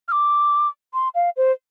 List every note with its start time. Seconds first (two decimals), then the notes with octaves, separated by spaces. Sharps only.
0.08 F6
0.12 D6
0.94 C6
1.15 F5
1.37 C5